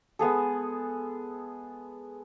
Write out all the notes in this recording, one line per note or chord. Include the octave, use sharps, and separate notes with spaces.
G#3 B3 G#4 A4